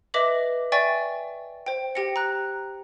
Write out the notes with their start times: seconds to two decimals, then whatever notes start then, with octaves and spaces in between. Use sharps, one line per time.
0.14 B4 D#5 E5 D6 A#6 F#7
0.72 D5 E5 G5 G#5 C#6 A6
1.66 C5 G5
1.95 G4 G5 A#6 C#7
2.16 A#5 F#6